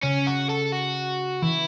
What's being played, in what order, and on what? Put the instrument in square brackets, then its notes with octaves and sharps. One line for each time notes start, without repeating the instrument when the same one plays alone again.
[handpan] C#3 [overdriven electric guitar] C#4
[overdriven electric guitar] F#4
A4
F#4
[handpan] E3 [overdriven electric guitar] E4